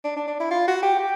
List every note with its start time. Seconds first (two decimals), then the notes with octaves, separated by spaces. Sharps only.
0.04 D4
0.16 D4
0.28 D4
0.40 E4
0.51 F4
0.68 F#4
0.83 G4
0.99 G4